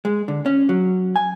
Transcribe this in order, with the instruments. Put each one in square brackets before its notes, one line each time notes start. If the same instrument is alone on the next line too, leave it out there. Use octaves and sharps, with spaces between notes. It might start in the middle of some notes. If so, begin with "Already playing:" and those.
[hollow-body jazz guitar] G#3
D3
C#4
F#3
G#5